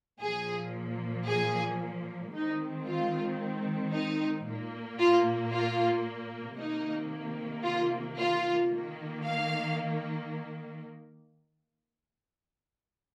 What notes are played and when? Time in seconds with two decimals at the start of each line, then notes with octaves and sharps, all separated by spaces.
0.21 A#2 F3 A#3 G#4
1.27 G#4
2.34 D#3 G#3 C4 D#4
2.87 F4
3.93 D#4
4.46 A#2 A#3
4.99 F4
5.51 F4
6.58 C3 D#3 A#3 D#4
7.64 F4
8.18 F4
8.71 D#3 A#3
9.24 F5